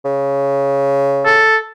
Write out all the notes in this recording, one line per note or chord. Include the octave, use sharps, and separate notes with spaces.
C#3
A4